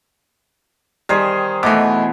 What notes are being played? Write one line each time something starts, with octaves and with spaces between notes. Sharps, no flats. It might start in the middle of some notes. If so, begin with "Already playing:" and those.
D#3 G3 G#4 C5
B2 E3 A3 D#5 D6